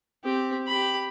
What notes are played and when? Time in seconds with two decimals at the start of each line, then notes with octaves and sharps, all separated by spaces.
0.24 C4 G4
0.68 G4 B5